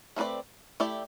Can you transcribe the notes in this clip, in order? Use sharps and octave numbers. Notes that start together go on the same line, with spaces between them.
A3 C4 F#4 B4 D5
A3 E4 G4 D5